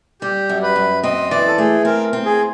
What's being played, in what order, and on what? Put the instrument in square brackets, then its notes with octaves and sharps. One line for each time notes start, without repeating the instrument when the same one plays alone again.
[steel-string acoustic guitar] G3 [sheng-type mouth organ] G4
[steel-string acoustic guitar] F#2
[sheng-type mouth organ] B4
[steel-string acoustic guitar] F#2
[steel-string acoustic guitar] C4 [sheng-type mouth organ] D#5
[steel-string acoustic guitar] E3 [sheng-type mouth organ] D5
[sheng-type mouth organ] A4
[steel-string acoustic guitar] A3 [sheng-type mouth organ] G#4
[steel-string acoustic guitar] C4 [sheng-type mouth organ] A#4
[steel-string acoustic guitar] C4
[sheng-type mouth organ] G#4